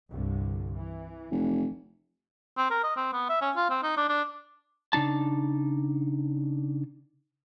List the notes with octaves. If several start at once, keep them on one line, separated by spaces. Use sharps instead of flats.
C2 G2 D3
E3
F1
C4
A#4
D#5
C4
B3
E5
C#4
F4
C4
D#4
D4
D4
C#3 D4 D#4 A5